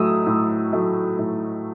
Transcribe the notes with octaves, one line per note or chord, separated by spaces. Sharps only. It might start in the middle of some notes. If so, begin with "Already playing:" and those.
Already playing: A2 F#3 A3 D#6 E6
A2
F#3 A3
A2